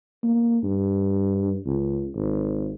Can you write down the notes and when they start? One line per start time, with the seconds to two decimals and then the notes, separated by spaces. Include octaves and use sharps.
0.24 A#3
0.64 G2
1.66 C#2
2.16 G#1